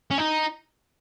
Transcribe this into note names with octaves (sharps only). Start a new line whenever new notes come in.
C#4
D#4